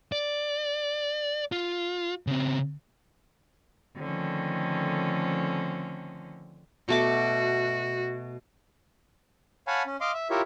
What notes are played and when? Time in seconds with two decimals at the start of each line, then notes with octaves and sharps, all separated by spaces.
0.12 D5
1.52 F4
2.27 C#3 C4
3.97 D3 D#3 F3 A3 C4 C#4
6.89 B2 A3 F#4 D6
9.67 C#5 F5 F#5 G#5 A5 B5
9.86 C#4
10.01 D#5 F5 C6 D6
10.14 E5
10.30 E4 F4 G4 A#4 C#5 E5